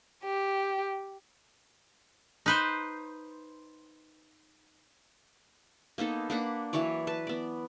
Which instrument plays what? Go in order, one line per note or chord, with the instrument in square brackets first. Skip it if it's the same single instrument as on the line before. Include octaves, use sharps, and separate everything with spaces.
[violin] G4
[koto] D#4 B4 C5
[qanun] A#3 B3 D#4 A4
A#3 D4 F#5 B5
E3 F#3 C#5 D5
B4 A5
B3 D5